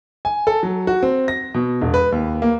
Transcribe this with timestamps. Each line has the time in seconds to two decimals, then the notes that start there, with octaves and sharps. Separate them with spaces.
0.25 G#5
0.47 A4
0.63 F#3
0.87 F#4
1.03 C4
1.28 A#6
1.54 B2
1.81 E1
1.94 B4
2.12 D#2
2.42 A#3